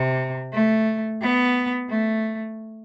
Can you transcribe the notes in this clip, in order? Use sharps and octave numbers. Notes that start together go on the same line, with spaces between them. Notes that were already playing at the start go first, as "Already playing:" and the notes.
Already playing: C3
A3
B3
A3